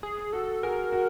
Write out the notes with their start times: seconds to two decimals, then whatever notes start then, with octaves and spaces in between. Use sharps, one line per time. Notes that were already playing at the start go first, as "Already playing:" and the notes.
0.03 G#4
0.33 F#4 A4
0.63 F#4 G#4 A#4
0.93 F#4